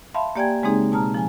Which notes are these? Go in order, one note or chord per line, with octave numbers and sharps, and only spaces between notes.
E5 F5 A5 B5 C6
A#3 G4 D5 G5 G#5 G#6
C#3 G#3 A#3 C4 D#4 G#4
B2 A5 A#5 F6
F3 G#5